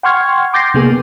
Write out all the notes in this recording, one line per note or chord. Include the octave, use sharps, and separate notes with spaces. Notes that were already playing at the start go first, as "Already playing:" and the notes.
F#5 G5 C6 C#6 F6 G#6
C6 D6 G6 A6 A#6 C7
C3 A#3 B3 G#4